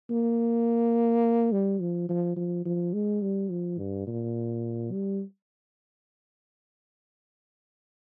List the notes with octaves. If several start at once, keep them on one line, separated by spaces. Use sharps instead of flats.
A#3
G3
F3
F3
F3
F3
G#3
G3
F3
G2
A#2
G3